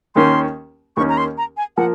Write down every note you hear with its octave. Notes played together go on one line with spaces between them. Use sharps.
D#2 D#3 A#3 C#4 C6
D#2 D#3 A#3 C#4 C#6
A#5
C6
A#5
G#5
F3 A#3 F#5